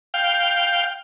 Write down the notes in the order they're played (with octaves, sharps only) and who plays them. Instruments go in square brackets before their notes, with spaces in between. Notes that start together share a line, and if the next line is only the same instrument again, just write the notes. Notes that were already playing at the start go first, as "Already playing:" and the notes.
[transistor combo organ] F5 G5